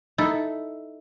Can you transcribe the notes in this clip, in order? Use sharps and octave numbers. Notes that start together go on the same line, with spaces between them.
D#4 E4 A4